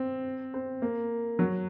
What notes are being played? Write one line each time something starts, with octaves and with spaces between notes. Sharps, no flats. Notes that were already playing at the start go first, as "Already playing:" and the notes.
Already playing: C4
C4
A#3
F#3